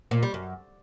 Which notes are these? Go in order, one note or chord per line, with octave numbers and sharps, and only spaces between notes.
A#2
G3
F#2